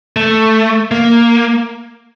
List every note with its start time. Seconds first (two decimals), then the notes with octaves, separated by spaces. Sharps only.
0.16 A3
0.91 A#3